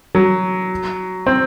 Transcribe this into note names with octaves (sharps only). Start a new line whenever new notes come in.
F#3
C4